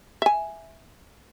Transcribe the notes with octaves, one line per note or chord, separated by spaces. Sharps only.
E5 G#5